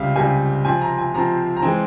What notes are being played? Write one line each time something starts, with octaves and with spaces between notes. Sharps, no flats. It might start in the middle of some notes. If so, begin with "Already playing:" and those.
Already playing: C#2 C3 G3 E5 F5
C#2 C3 G3 G#5
C3 F3 C4 G#5
A#5
G#5
C3 F3 C4 A#5
A#5
E3 G#3 C4 G#5